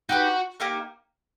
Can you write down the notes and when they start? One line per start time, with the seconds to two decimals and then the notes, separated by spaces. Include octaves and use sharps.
0.09 D#4 F#4 G4 B4
0.60 A#3 D#4 G4 A#4